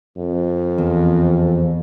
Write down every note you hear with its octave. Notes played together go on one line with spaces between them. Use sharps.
F2
E2